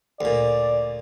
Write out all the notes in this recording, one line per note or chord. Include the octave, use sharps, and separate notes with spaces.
D2 A#2 D5